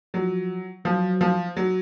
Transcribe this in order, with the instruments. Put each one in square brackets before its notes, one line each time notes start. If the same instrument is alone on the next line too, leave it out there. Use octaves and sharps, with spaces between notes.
[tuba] F3 [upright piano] F#3
[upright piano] F3 [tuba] F#3
[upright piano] F3
F#3